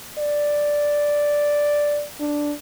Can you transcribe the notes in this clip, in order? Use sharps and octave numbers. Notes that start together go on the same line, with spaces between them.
D5
D4